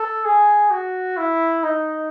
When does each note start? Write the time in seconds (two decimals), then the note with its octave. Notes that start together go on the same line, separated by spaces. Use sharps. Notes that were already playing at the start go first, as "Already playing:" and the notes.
Already playing: A4
0.25 G#4
0.71 F#4
1.17 E4
1.63 D#4